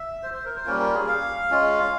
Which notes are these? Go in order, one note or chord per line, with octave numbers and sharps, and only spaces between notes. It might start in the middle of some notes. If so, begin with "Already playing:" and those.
Already playing: E5
C5
C5
A#4
C5
G3 A#3 C#4 F4 A#4
A#4
G#4
F5
G#3 C#4 F4